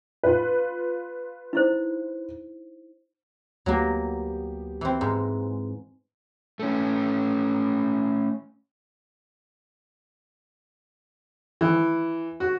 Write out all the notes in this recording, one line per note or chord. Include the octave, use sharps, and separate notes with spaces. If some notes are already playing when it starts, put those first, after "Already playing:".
F4 B4
D#4 E4 C5
D2 F#3 A#3 B3 G4
E3 C4
G#2
A3 C#4
E3
F#4